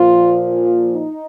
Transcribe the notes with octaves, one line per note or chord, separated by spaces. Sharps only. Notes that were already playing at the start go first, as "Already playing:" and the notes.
Already playing: A#2 F3 F4
D#4